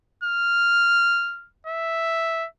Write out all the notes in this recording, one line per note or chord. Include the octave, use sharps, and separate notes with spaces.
F6
E5